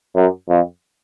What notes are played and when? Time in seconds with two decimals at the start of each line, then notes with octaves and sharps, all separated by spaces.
0.16 F#2
0.49 F2